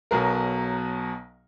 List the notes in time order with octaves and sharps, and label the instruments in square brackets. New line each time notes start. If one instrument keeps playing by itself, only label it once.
[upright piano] B1 B2 F#3 A#4